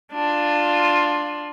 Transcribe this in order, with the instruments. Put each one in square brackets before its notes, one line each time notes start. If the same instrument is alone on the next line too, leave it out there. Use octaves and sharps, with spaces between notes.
[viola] D4 F4